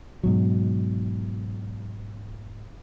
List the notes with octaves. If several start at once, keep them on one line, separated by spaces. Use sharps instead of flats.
G#2 B2 F#3